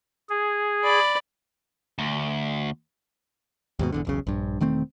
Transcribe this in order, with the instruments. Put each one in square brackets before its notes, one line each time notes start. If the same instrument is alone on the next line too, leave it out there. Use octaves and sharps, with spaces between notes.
[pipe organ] G#4
[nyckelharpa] D5 B5
[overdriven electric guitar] D2
[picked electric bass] D#2 G#2 B2
E1 E2 D3
E1 B1 C#3
A#1 G2
E1 D#3 A3 C4